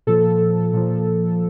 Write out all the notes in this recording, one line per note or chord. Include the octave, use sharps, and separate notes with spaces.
A#2 F3 A4
A#2 F3